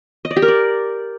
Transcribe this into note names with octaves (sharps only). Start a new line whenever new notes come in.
D#5
D5
G4
A#4
D5